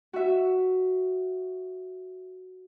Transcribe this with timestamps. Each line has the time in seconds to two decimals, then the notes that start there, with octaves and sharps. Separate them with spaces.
0.13 F#4 E5